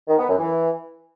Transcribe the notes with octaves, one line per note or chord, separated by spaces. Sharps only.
D#3
B3
F#2
E3